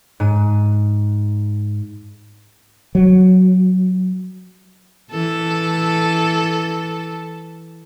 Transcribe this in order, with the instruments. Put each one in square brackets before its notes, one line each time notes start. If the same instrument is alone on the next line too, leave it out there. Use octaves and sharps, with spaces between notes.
[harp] G#2 D#7
[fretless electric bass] F#3
[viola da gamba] E3 A4